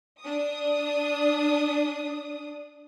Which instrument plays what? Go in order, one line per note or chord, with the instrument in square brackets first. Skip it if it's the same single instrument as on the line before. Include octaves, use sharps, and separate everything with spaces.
[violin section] D4 D#6